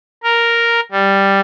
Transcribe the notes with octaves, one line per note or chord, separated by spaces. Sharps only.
A#4
G3